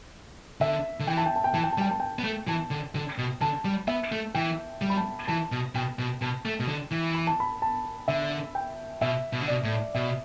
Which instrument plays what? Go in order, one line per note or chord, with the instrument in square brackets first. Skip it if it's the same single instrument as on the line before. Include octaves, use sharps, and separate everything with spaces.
[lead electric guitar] D3 [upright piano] E5
[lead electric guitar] D3
[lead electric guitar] E3 [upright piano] G5
[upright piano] A5
G5
A5
G5
[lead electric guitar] E3 [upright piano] A5
[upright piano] G5
A5
[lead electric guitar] G3
[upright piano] G5
A5
G5
[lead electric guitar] B3
A3
[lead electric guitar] E3 [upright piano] A5
[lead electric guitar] D3
D3
B2
[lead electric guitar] D3 [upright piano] A5
[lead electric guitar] G3
[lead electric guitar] B3 [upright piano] E5
[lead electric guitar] A3
[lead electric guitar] E3 [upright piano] G5
[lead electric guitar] G3
[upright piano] B5
A5
[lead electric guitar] E3 [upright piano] A5
[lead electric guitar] B2
[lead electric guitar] B2 [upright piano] G5
[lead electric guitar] B2
[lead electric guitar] B2 [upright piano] A5
[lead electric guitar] A3
B2
D3
E3
[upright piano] B5
A5
B5
A5
[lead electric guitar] D3 [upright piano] E5
[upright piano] G5
[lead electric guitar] B2 [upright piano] E5
[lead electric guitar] B2
D3
[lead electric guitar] B2 [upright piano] D5
[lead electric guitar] A2
[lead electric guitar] B2 [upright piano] E5